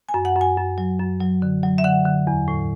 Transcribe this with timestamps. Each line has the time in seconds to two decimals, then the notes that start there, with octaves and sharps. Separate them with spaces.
0.09 G#5
0.14 F#2
0.25 F#5
0.36 F#2
0.41 G#5
0.57 F#2
0.78 F#3
0.99 F#2
1.20 F#3
1.42 D3
1.63 F#3
1.78 E5
1.84 D3 F#5
2.06 D3
2.27 E2
2.48 A2